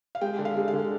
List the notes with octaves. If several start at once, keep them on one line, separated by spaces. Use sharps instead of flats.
F5
G#3 G5
D3
F5
G#3
F5
D3